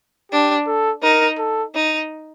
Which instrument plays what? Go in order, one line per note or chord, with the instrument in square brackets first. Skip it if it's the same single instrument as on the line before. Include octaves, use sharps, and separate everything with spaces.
[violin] D4 [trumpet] G4
[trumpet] A4
[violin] D#4 [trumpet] A#4
[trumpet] A4
[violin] D#4